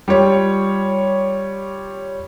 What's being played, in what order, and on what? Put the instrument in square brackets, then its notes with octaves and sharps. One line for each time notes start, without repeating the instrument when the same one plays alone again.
[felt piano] G3 F4 C#5